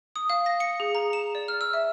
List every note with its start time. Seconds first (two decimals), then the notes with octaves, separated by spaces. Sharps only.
0.16 D#6
0.30 F5
0.46 A#6
0.60 C#7
0.80 G#4
0.95 A#5
1.13 E7
1.35 D5
1.48 F6
1.61 E6
1.73 E5